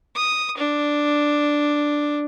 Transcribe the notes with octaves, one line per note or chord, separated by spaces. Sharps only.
D#6
D4